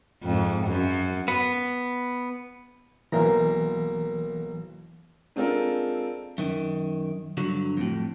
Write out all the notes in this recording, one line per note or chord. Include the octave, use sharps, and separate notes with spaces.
F2 G#2
F#2
B3
B1 E3 A#3 A#5
G#3 C4 D4 F4 A4 A#4
F#2 D#3
G2 D3 F#3
F2 A2